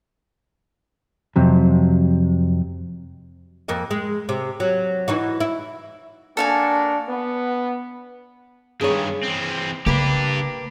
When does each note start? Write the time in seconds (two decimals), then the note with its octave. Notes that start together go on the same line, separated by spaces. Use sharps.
1.36 F2 C3 F#3
3.68 F2 A#3 D#5
3.91 G#3
4.29 C3
4.60 F#3
5.08 E3 D#4 F#4
5.40 E4
6.37 A#3 D4 F#4 A4 F5 G#5
7.08 B3
8.81 G2 D#3 G#4 C#5
9.23 E3 C4
9.86 C#3 A#3 D4 G4 B4